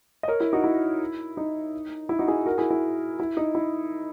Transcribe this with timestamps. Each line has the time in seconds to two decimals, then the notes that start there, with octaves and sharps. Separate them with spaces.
0.23 D#5
0.28 A#4 C#5
0.40 E4
0.53 D#4 F#4
0.64 E4
1.37 D#4
2.09 E4
2.19 D#4 F#4
2.28 E4 G#4
2.46 F#4 A#4
2.58 E4 G#4
2.71 E4
3.20 E4
3.37 D#4
3.55 E4